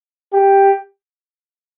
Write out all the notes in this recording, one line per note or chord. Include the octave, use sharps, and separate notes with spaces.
G4